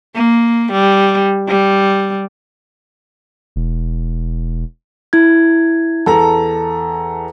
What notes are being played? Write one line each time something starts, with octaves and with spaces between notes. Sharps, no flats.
A#3
G3
G3
E1
E4 G#6
E2 A4 A5 A#5